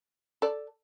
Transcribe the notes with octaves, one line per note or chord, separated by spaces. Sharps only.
A4 D5